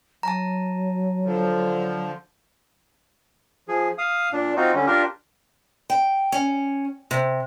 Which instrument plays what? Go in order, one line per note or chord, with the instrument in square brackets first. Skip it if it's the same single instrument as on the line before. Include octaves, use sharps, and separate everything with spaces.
[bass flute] F#3 [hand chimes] A5 A#5
[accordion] D3 F3
[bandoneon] F3 G#4
F5 D#6
A#2 D4
C4 D#4 F4 F#4
D3 G3 C#4
D4 F4 G4 A#4
[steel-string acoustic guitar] G5
C#4
C3